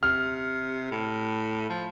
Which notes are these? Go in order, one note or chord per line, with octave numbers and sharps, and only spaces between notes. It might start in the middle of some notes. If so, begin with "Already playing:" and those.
C3 F6
A2
F3